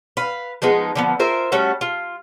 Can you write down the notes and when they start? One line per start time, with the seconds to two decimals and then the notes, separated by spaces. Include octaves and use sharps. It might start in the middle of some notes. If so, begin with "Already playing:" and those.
0.17 B4 F5
0.62 F3 G#3 B3 D#4
0.95 D3 F3 B3
1.19 F4 A#4 C5 E5
1.52 G3 A3 C#4 F#4
1.81 F4